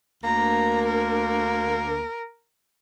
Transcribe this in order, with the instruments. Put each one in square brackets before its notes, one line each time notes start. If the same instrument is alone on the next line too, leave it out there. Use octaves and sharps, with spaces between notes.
[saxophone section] D2 A#3 [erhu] A#5
[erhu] A#4